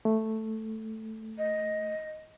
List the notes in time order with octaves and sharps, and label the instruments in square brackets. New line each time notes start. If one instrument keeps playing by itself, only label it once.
[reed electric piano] A3
[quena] D#5